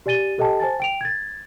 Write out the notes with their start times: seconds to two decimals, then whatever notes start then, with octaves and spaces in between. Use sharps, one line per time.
0.06 G4 D5 G#5 A6 D#7 G7
0.38 G4 A4 D#5 G5 A5
0.60 C5 G#5 A5 A6
0.80 G5 D7 F7
1.01 G#6 A6